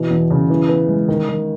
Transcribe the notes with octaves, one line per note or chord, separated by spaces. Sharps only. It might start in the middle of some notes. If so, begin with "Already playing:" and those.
Already playing: B2 E3
E2
C#3
E3
B3
G#3
D#3
D#3